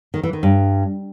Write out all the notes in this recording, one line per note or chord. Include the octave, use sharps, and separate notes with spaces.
D#3
E3
D#3
G2